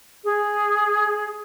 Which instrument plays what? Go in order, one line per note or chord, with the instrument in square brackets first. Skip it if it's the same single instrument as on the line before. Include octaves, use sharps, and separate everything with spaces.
[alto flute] G#4